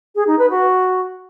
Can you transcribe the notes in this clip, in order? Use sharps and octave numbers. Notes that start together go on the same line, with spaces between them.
G#4
D#4
B4
F#4